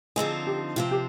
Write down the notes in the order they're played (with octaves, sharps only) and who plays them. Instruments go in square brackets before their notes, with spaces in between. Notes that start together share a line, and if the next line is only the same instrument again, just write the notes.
[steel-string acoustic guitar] D3 F3 C4 D#4 [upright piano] G#4
[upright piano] G4
[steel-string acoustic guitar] C3 F3 C4 [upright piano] F4
[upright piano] G4